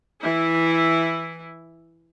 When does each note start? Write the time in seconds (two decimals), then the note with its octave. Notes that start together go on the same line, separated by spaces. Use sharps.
0.21 E3 E4